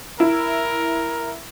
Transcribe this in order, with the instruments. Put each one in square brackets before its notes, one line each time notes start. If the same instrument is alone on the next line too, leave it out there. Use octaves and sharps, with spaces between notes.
[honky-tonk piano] E4 [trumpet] A#4